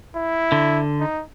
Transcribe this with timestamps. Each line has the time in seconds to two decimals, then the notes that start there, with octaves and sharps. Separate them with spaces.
0.16 E4
0.52 D3
1.00 D#4